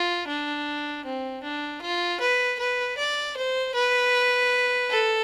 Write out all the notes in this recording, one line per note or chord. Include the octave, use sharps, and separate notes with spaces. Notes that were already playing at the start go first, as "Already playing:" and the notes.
Already playing: F4
D4
C4
D4
F4
B4
B4
D5
C5
B4
A4